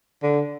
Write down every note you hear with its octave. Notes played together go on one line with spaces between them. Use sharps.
D3